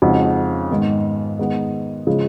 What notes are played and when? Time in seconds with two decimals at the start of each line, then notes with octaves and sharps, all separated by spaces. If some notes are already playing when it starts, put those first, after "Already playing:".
0.02 F2 C#3 G#3 D#4 F#4
0.70 G#2 D#3 G#3 B3
1.39 D#3 G#3 B3 D#4
2.07 C#3 F3 G#3